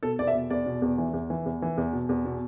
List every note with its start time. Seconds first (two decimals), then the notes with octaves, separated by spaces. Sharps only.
0.03 B2 A4
0.19 E2 D5
0.27 E5
0.35 B2
0.50 E2 D5
0.66 B2
0.82 E2
0.98 E3
1.14 E2
1.30 E3
1.46 E2
1.62 E3
1.78 E2
1.93 B2
2.09 E2
2.25 B2